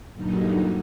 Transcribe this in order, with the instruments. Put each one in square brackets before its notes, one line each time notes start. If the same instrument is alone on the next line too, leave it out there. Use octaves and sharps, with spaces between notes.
[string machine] G2 A#2 D3 F#3 G3 D#4